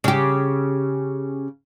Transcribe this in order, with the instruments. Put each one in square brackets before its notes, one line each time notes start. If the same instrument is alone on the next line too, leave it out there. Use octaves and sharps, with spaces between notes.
[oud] C#3 G4